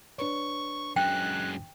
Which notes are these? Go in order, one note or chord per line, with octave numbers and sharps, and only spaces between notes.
D4 B4 C#5 C#6
F#2 G#3 G5 F#6